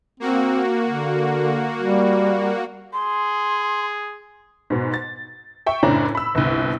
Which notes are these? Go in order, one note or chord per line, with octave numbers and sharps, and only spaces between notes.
A#3 C4 F#4
D3
G3
G#4 C6
G#2 B2
A6
E5 G5 C#6
F#1 A2 C#4 D4 A#5
B5 E6
G1 C2